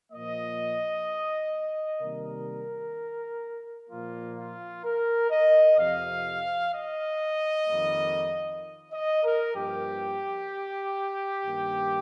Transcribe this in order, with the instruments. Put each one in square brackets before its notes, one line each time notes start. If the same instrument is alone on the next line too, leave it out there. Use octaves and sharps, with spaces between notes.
[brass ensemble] A#2 F3 A#3 D#5
C3 D#3 G3 A#3 A#4
A#2 F3 A#3 F4
F4
A#4
D#5
F2 C3 F3 F5
D#5
F2 D#3 G3 A#3
D#5
A#4
G2 F3 A#3 G4
G2 D#3 A#3